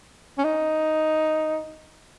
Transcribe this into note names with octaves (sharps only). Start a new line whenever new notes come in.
C#4
D#4